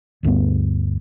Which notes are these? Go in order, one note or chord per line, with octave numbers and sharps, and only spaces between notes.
G1 D2 G2 B3